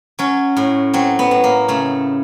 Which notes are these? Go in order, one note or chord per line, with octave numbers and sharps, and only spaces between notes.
F#3 C#4
A2
F#3 C4
B3
A2
A#3
C#3 A3